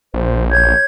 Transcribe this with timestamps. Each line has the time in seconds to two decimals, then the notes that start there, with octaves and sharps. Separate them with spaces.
0.14 A#1 C5
0.51 C#5 G6 G#6